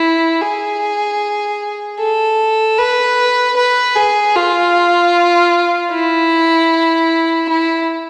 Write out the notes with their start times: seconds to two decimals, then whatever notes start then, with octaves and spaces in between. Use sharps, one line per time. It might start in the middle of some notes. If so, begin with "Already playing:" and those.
Already playing: E4
0.42 G#4
1.99 A4
2.78 B4
3.56 B4
3.95 G#4
4.35 F4
5.92 E4
7.49 E4